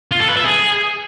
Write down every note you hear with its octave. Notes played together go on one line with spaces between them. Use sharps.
F4
A4
B4
E5
G#4